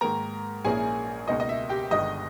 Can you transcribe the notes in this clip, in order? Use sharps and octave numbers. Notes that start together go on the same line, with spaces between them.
G#2 D#3 A#3 A#4 A#5
A#1 A#2 A#3 C#4 E4 G#4 G#5
C#2 B2 A#3 D#4 D#5
D#5
E5
G4 G5
G1 G2 D#3 G#3 B3 D#5 D#6